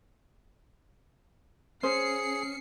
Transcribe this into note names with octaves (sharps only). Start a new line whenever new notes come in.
C#4 G#4 C5 C7 C#7